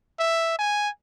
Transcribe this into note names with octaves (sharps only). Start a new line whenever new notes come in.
E5
G#5